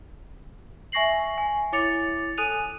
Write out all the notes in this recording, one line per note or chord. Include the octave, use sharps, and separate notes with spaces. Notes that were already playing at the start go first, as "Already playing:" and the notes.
E5 G#5 C#6 A#6 C7 F#7
G#5
E4 C#5 D6 A6 C#7 F7
A4 G#5 D#6 F#6 D#7 F7